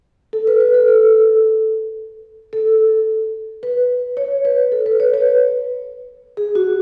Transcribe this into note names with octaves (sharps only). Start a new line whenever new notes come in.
A4
B4
B4
A4
A4
A4
B4
C#5
B4
A4
B4
C#5
B4
G#4
F#4